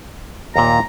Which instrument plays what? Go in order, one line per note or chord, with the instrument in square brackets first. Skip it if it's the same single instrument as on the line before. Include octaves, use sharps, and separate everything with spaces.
[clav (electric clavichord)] D#2 A#2 [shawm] A#5